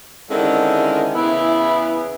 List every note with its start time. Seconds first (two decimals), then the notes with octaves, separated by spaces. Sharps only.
0.30 D3 D#3 G#3 C4 C#4 E4
1.14 E2 C#3 B3 E4